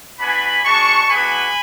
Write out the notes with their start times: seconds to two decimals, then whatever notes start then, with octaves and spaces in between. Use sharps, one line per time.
0.19 B3 D4 F#4 G#5 B5
0.64 G#3 D4 F#4 A5 C#6
1.10 G#3 B3 D4 F#4 G#5 B5